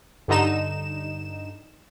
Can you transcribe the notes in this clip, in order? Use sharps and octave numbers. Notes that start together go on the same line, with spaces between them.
G2 D3 D#4 E7